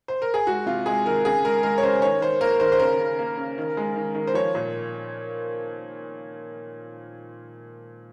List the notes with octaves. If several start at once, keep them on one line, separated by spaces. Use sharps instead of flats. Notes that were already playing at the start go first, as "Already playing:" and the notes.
C5
A#4
G#4
G#3 F#4
C3 F4
G#3 G#4
D#3 A#4
C#3 G#4
G#3 A#4
G#3 A#4
C#5
C#3 C5
D#3 C#5
D#3 C5
A#3 A#4
D#3 C5
C5
C#3 A#4
C#3
A#3
C#3
D#3
G#3
D#3
D#3
C5
F3 C#5
A#2